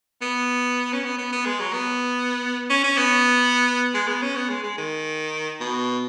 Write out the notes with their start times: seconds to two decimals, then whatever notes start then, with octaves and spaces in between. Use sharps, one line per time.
0.22 B3
0.93 C#4
1.04 B3
1.18 B3
1.32 B3
1.46 G#3
1.60 F#3
1.73 B3
2.70 C#4
2.84 C#4
2.98 B3
3.94 G#3
4.08 B3
4.22 C#4
4.36 B3
4.49 G#3
4.63 G#3
4.77 D#3
5.60 B2